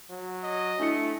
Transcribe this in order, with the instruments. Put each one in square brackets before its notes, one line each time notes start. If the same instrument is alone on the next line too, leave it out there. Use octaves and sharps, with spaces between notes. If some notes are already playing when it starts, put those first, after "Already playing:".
[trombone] F#3
[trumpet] D#5
[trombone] A3 [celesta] D4 E4 C#7